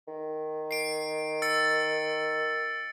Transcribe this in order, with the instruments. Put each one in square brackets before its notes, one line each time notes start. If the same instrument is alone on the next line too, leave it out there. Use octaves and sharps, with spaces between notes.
[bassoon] D#3
[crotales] C7 D7
E6 A6 C#7